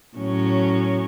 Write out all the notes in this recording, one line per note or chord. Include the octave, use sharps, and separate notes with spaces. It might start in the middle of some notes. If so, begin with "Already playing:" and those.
A2 F#3 C#4